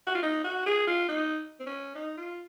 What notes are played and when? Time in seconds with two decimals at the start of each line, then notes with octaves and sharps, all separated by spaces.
0.07 F#4
0.15 F4
0.23 D#4
0.44 F#4
0.66 G#4
0.87 F4
1.09 D#4
1.60 C4
1.66 C#4
1.95 D#4
2.17 F4